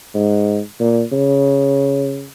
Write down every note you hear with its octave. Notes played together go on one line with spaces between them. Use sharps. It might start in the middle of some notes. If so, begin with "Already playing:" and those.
G#2
A#2
C#3